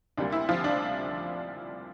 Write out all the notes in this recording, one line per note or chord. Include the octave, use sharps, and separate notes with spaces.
D2 C3 G3 A#3 D4
E4
F3 F4
D4